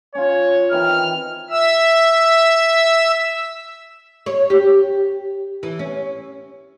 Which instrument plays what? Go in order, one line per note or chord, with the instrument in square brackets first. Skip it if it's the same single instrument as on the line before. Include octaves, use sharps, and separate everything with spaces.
[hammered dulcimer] C#4 F4 [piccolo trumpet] C#5
[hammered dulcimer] D#3 E3 C4 [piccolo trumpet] F6
[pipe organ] E5 E6
[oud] C#5
G4
E3
C#4